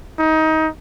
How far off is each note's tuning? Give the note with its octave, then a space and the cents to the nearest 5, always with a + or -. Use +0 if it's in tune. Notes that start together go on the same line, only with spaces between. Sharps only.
D#4 +25